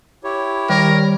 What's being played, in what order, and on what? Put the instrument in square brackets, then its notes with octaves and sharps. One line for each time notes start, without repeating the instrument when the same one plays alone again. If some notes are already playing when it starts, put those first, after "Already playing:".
[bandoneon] E4 G4 C#5
[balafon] D#3 [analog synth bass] G3 [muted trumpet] A#4